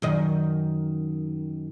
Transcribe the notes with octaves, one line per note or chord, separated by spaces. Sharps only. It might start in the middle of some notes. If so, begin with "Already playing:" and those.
F#2 D#3 D#5